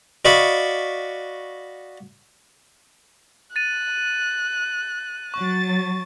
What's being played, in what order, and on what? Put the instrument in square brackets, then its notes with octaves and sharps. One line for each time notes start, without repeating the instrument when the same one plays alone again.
[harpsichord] F#4 D5 D#5 F5 B5 C#6
[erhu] F#6 [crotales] A6 D#7
[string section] F#3 A6 [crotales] C#6